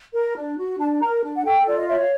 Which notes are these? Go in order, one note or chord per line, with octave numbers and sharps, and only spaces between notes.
A#4
D4
F#4
D4 A5
A#4 A#5
D4
F#5
A4 G5
F4 D5
D#5
C#5 E5
F5